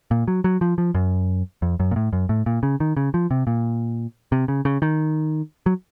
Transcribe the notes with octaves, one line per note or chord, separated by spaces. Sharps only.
A#2
F#3
F#3
F3
F3
F#2
F2
F#2
A#2
A2
F#2
A2
A#2
C#3
D#3
C#3
F3
C3
A#2
C3
C#3
C#3
D#3
F#3